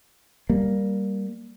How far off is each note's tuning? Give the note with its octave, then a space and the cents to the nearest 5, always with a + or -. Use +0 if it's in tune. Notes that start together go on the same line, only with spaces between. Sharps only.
G3 +0 A#3 +0